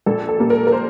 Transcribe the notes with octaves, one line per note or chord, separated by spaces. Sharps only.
A#1 A4
A4
A#2 G3 A#3
A#4
A#4
C5